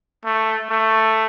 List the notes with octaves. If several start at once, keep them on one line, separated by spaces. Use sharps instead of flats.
A3
A3